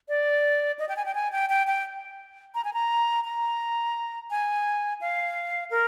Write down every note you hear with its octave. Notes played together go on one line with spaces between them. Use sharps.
D5
D#5
G5
G#5
G5
G#5
G5
G5
G5
A#5
G#5
A#5
A#5
G#5
F5
A#4